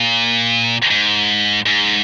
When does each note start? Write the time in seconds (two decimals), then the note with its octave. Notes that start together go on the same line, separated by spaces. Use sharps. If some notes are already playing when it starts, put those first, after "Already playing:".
Already playing: A#2
0.91 G#2
1.66 G#2